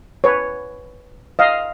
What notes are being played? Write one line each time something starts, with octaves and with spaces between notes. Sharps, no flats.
B4 C#5
D#5 F5